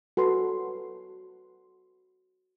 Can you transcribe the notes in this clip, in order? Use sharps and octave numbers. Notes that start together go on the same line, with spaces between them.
F#4 A4 B4 C6